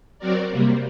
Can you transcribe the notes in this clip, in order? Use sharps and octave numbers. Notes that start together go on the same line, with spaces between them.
F#3 C4 F#4 A#4 D5
C3 G3 A#3